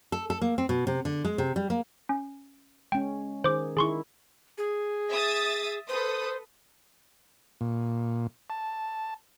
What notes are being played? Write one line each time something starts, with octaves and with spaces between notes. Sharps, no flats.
A4
A4
A#3
C4
B2
C3
D3
G#3
C3
G3
A#3
C#4
G#3 C#4 G5
D#3 G#4 C5 D6
D#3 E4 G#4 C6 C#6
G#4
E5 D#6 A6
A4 B4 C5 D#6
A#2
A5